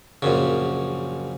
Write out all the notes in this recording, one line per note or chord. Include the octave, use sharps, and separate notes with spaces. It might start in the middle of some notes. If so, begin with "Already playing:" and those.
A#1 F#2 C#3